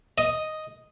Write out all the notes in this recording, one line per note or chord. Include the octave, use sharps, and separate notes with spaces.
D#5